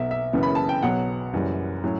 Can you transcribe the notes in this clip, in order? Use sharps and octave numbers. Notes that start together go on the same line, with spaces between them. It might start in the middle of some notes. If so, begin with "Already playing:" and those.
Already playing: B1 B2 F#3 E5
E5
F#1 F#2 C#3 E3 B3
B5
A5
G5
B1 B2 F#3 F#5
F#1 F#2 E3 G3
A2 F#3 C#4